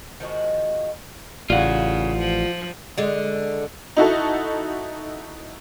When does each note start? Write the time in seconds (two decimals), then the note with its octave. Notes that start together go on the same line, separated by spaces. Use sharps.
0.20 D#3 F3 G#3 F#4
1.50 A1 C#3 F4 D5 F5 F#5
2.18 F3
2.98 D3 G#3
3.96 D#4 E4 F#4 A4